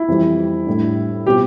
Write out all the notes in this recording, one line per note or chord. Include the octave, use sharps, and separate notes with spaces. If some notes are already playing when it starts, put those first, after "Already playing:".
Already playing: E4
F2 E3 G3
A2 G3 D4
B2 G3 C4 F4 G4